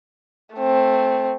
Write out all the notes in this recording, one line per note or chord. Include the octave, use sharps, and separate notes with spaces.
A3 C4